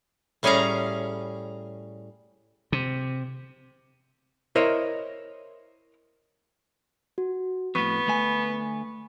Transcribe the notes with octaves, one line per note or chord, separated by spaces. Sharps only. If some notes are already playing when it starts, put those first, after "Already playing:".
A2 G3 C#4 G#4 F5 A#5
C3
E4 A#4 C5 C#5 D#5
F#4
F2 A2 B3 C#6
D2 A3 G#5